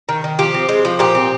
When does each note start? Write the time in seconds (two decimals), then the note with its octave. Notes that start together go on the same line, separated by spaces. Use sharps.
0.09 D#3
0.24 D#3
0.39 F3 G4
0.54 C4
0.69 G#3
0.85 F3
0.99 A#2 G4
1.15 C4